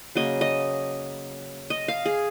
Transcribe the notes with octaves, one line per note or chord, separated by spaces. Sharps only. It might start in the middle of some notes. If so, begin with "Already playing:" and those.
C#3 F#3 A#3 D#5
D#5
D#5
F5
G#4